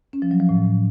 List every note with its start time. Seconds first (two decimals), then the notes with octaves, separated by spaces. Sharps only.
0.13 C#4
0.22 F3
0.31 F#3
0.40 F3
0.49 A2